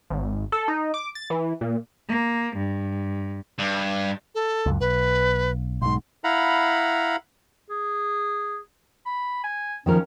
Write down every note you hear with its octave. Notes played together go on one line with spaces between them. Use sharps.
G#1
A4
D#4
D6
A6
E3
A#2
A#3
G2
G2
A4
C#2 F#2
B1 B4
B1 G#2 C6
E4 F5 F#5 A#5 B5
G#4
B5
G#5
D#3 F3 C#4 A#4